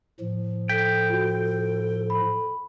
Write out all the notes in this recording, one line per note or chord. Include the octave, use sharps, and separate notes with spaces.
A2 F3
A4 G5 B6
F4 F#4
B5